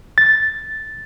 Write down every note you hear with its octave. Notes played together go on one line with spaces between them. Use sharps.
A6